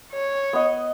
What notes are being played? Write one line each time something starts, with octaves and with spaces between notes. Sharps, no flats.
C#5
B3 D#5